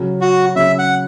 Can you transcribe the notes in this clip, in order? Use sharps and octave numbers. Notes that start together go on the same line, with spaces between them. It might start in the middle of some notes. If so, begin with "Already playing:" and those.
Already playing: C#3 F#3 C#4
F#4
C#3 F#3 C#4 E5
F#5